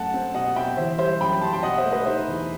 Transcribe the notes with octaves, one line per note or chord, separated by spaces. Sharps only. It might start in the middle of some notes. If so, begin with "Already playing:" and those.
Already playing: F#2 A3 F#5 A5
C4
B2 D#5 F#5
B2 E5 G5
E3 C5 E5
G3 C5 E5
F#2 G5 B5
F#2 A5 C6
G5
B2 D#5 F#5
C5 E5
A3
B4 D#5
D#4 C5 E5
E2